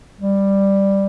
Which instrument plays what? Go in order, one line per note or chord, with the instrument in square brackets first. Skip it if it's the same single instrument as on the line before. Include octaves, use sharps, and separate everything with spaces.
[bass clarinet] G3